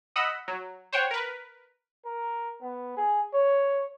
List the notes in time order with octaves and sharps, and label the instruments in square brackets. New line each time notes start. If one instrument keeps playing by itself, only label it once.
[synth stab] D#5 F#5 B5 E6
F#3
C5 C#5 F#5 G5
A#4 B4
[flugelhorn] A#4
B3
G#4
C#5